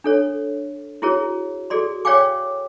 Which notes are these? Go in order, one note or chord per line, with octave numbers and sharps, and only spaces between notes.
D4 A4 C#5
E4 F#4 G#4 A#4 C#5
F#4 G#4 A4 D5 C6
C#5 D5 F5 G5 G#5 D6